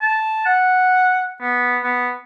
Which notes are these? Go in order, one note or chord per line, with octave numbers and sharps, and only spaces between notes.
A5
F#5
B3
B3